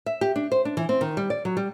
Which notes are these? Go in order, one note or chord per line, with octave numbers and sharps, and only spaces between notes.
E5
G4
D4
C5
D4
E3
C4
D#3
G3
D5
F#3
G3